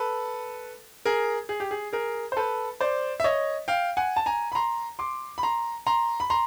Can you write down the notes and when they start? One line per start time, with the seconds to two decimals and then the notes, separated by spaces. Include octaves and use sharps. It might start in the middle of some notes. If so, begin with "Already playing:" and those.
Already playing: A4 B4
1.06 G#4 A#4
1.49 G#4
1.60 G4
1.71 G#4
1.93 G#4 A#4
2.32 C5
2.37 A4 B4
2.81 C5 D5
3.20 E5
3.24 C#5 D#5
3.68 F5 G5
3.97 F#5 G#5
4.16 A5
4.26 G#5 A#5
4.52 B5
4.55 A#5 C6
4.99 C6 D6
5.38 B5
5.43 A#5 C6
5.87 A#5 C6
6.20 B5
6.30 A#5 C6